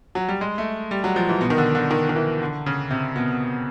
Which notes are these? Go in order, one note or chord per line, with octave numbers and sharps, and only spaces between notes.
F#3
G3
G#3
A3
G3
F#3
F3
E3
B2
D#3
D3
D3
D#3
D#3
E3
D3
C#3
C3
B2